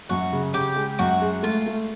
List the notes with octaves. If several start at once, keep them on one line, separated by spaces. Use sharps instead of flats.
F#2 F#4
C#3
C#3 G4
G#3
F#2 F#4
G#3
A3 F4
A3